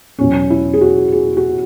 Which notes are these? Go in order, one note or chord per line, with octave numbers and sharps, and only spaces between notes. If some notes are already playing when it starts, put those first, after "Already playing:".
E2 B2 F#3 C#4
E4
G#4
F#4
G#4
F#4